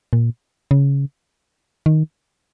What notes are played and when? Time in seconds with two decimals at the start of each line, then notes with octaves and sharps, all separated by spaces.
0.13 A#2
0.71 C#3
1.86 D#3